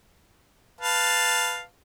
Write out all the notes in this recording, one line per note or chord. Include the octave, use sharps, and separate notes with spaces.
B4 F5 A5